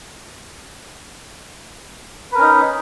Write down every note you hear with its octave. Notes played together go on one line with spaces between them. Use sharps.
C#4 D#4 A#4 B4